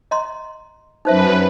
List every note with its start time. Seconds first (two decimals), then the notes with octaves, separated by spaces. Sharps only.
0.11 D#5 A#5 C6
1.05 F#2 D#4 B4 C5 E5